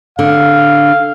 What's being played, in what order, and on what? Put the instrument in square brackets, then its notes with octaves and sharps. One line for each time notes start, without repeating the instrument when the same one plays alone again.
[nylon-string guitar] D3 [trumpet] F5